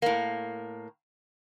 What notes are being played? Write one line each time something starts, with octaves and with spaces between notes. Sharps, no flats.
A2 A#3